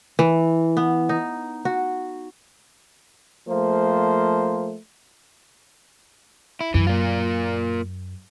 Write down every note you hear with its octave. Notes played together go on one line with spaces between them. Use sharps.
E3
B3
D#4
F#4
F3 A3 A#3 C5
E4
F#2 E3
A#3 F4